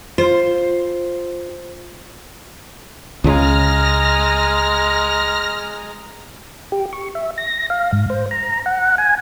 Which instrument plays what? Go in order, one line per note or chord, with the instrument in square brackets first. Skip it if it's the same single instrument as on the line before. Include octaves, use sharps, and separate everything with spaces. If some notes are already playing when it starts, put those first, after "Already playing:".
[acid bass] F4 [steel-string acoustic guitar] C5
[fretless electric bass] C#2 C#3 [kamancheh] G#3 A#5 [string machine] F6 A#6
[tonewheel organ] G4
C#6
E5
A#6
F5
G#2
C5
A#5
F#5
G#5